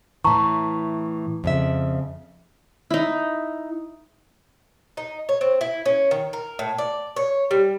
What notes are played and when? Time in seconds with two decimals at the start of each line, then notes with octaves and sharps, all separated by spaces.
0.24 A2 E3 A5 A#5 C#6
1.44 F2 C#3 E5
2.91 D#4 E4
4.97 D#4
5.29 C#5
5.41 C4
5.61 E4
5.86 C#4
6.11 D#3
6.33 A#4
6.59 A2
6.78 D5
7.16 C#5
7.51 G3